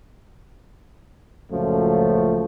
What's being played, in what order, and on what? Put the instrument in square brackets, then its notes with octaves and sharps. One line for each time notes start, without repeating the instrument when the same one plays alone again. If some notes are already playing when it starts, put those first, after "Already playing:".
[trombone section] C#2 F#2 A#2 F3 A3